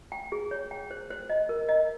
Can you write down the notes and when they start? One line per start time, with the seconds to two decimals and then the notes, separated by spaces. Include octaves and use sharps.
0.12 G5
0.32 G#4
0.51 C#5
0.71 G5
0.91 C5
1.10 C5
1.30 D#5
1.49 A#4
1.69 D#5